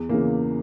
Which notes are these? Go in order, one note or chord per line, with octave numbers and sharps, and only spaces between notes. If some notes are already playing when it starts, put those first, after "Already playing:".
Already playing: E2
C#3 E3 A#3